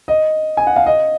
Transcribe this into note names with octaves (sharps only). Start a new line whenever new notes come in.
D#5
G#5
F#5
F5
D#5